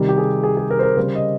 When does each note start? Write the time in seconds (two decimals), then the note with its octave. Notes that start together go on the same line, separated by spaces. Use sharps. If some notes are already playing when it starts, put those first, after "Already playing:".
Already playing: C3 D#3 G3
0.09 G4
0.18 G#4
0.43 G#4
0.57 G#4
0.71 A#4
0.79 C5
0.83 A#4
0.97 C#3 G3 C5
1.15 D#5